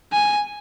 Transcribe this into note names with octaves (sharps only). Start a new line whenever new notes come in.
G#5